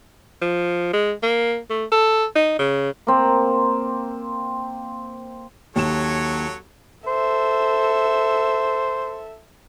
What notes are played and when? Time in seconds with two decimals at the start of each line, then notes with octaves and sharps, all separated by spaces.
0.41 F3
0.93 G#3
1.23 A#3
1.70 A3
1.91 A4
2.35 D#4
2.59 C#3
3.07 A#3 C4
5.76 D#2 F#3 A4 C#5 E7
7.07 A4 C5 E5